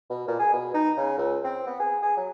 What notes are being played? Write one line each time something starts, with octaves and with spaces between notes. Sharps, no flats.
B2
A#2
G#4
B2
D#4
C#3
C#2
C4
B3
G#4
G#4
F#3